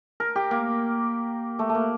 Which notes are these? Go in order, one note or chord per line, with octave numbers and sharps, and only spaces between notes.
A#4
G4
A#3
A3
A3
A#3